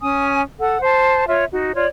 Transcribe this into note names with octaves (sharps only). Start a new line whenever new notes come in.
C#4 G#5 D#6
A4 F#5
C5 A5
F4 C#5 E5
D#4 F#4
F4 C#5 D5